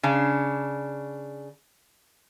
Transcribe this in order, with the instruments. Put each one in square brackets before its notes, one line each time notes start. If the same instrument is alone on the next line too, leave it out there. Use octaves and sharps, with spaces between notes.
[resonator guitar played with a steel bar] C#3 D4